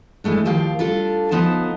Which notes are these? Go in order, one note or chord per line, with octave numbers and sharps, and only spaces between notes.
E3 G#3 A3 D4
D#2 D#3 F3 G4 F5
G3 D4 F4 A4
D2 F3 B3 D#4 C5 A5